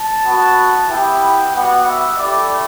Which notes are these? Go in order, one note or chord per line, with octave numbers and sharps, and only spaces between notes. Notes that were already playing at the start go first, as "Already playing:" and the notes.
Already playing: A5
B3 F#4
B3 E4 G4 G5
G3 B3 F#4 F#5
E5
A3 E4 G4 D5